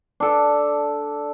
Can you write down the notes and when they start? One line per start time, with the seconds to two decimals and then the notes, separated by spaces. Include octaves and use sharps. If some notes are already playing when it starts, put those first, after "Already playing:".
0.20 D4 A4